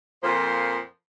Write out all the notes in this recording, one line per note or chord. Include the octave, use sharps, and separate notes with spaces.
F2 A#2 F3 C5